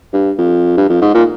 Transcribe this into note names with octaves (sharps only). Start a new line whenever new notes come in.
G2
F2
G2
F2
G#2
A#2